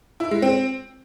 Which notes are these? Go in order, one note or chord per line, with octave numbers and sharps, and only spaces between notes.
E4
G#3
C4